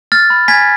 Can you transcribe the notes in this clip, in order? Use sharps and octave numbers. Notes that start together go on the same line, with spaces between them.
F6 A6
B5
G#5 G#6 B6